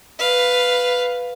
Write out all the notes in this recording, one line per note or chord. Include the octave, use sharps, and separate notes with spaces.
B4 F5